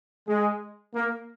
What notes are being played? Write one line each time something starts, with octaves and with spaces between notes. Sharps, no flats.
G#3
A#3